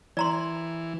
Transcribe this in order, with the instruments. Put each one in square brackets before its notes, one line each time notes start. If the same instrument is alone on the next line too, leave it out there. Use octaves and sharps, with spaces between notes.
[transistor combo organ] E3 [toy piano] D5 A#5 C6